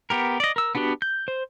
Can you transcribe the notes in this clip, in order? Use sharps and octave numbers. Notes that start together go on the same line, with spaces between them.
B3 G4 A#4
D5 D#5
A#4 E6
B3 D4 F#4 G4 B4
G6
C5